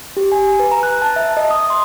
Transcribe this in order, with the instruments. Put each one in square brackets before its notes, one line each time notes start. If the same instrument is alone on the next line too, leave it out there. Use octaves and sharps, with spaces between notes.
[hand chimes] G4
G#5
B4
A#5
F#6
A5
E5
D#5
D#6
C6